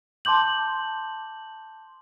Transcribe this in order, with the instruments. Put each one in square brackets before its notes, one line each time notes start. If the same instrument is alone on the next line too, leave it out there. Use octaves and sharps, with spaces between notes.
[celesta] A5 C6 D6 G6 F#7